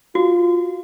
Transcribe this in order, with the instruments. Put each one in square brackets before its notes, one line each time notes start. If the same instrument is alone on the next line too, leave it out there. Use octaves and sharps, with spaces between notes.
[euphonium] F4 [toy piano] F#4